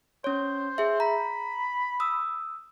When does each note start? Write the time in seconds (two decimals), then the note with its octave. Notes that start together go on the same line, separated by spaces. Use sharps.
0.24 C#4 C5 C#5
0.78 G#4 E5
1.00 A#5 B5
2.00 D#6 E6